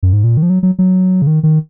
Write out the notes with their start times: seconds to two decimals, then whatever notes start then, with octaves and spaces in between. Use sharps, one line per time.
0.03 F#2
0.13 G#2
0.24 A#2
0.37 D#3
0.43 F3
0.50 F#3
0.63 F#3
0.79 F#3
1.22 C#3
1.27 D#3
1.43 D#3